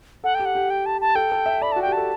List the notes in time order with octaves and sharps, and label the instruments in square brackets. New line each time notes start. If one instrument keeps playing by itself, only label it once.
[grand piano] A4 [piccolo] F#5
[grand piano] G4 [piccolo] G5
[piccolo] F#5
[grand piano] G4
[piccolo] G5
A5
A5
[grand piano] A4 [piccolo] G5
[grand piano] A4
E5
[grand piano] D5 [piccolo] B5
[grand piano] F#4 [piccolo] A5
[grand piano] G4 [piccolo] G5
[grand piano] A4 [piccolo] A5